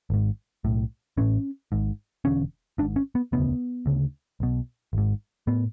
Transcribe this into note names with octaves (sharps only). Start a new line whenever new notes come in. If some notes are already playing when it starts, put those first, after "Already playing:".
G#1 G#2
B1 A2
A1 A2 C#4
G#1 G#2
E1 E2 D3 C#4
G#1 G#2 D4
C#4
B3
E1 D2 C#3 B3
D2 C#3
B1 B2
G#1 G#2
A2 B3